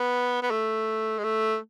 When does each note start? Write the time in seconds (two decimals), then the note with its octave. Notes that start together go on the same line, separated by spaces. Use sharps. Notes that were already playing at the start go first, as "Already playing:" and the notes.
Already playing: B3
0.42 B3
0.51 A3
1.18 G#3
1.24 A3